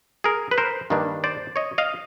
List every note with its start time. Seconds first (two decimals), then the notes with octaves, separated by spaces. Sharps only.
0.24 G#4 A#4
0.51 B4
0.58 A#4 C5
0.90 G2 D#3 G3 A#3 D4
1.24 C5 D5
1.56 C#5 D#5
1.78 D#5 F5